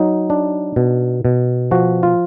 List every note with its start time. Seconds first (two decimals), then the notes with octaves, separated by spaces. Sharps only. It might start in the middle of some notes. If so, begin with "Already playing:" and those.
Already playing: F#3 D#4
0.30 D4
0.76 B2
1.25 B2
1.71 F3 F#4
2.03 F4